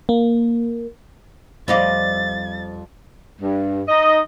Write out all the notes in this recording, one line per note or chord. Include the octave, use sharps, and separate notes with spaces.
A#3
F2 G3 C5 D5 D#5 F5 A6
G2
D#4 D#5